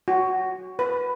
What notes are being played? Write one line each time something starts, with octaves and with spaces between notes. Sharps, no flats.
F#4
B4